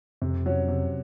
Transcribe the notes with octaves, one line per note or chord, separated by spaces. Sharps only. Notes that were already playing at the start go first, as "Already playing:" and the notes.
F2 C3
F#3 C#4
C3